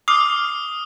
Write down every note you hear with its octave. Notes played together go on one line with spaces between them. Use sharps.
D6 D#6 F6 C7